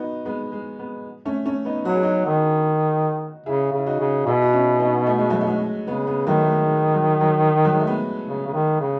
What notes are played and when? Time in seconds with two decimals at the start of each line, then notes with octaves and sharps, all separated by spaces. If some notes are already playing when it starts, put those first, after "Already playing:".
Already playing: B3 D#4 F#4
0.25 G#3 B3
0.52 G#3
0.79 G#3 B3
1.25 A3 C#4
1.46 A3 C#4
1.65 B3 D#4
1.85 F#3 F#4
1.95 G#4
2.03 D#4 F#4
2.26 D#3
3.46 C#3 E4 G#4
3.73 C#3
3.78 E4
3.87 D#4 F#4
4.00 C#3
4.26 B2 E4 G#4
4.42 F#4
4.53 C#4 E4
4.79 B3 D#4
5.07 A3
5.18 G#3
5.30 F#3 A3
5.41 A3
5.47 G#3
5.86 C#3 G#3 B3
6.06 G#3 B3
6.27 D#3 F#3 A3
6.40 A3
6.46 G#3
6.66 G#3
6.94 F#3
7.21 F#3
7.65 F#3
7.72 G#3
7.80 A3
7.87 G#3 B3
8.28 C#3
8.47 C#3
8.54 D#3
8.80 C#3